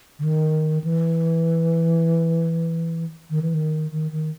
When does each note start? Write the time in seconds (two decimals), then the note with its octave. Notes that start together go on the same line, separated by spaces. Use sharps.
0.19 D3
0.23 D#3
0.84 E3
3.30 D#3
3.42 E3
3.54 D#3
3.91 D#3
4.11 D#3